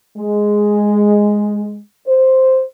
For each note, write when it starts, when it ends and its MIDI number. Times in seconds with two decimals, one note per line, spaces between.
0.18 1.81 56
2.07 2.64 72